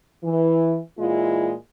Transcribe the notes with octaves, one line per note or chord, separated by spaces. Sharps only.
E3
A#2 E3 G#3 E4 F4